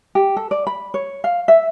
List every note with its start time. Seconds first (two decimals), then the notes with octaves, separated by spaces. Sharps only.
0.15 G4
0.37 A4
0.51 D5
0.67 B5
0.94 C#5
1.24 F5
1.48 E5